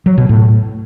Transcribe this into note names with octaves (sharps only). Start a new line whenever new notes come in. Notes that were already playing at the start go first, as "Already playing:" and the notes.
F#3
B2
A2